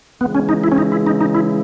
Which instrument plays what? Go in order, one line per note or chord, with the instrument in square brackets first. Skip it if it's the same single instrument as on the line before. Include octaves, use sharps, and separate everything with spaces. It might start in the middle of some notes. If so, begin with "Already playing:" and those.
[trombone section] C#3 E3 G#3 [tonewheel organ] B3
[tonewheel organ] C#4
D#4
E4
C#4
D#4
E4
D#4
D#4
E4